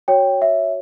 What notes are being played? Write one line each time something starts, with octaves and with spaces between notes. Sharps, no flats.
F#4 C#5 G5
E5